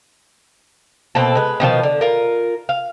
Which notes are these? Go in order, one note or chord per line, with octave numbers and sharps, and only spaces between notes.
B2 A#3 C4 A4
G#3 B4
B2 D#3 F3 A5
D3
F4 A#4
F5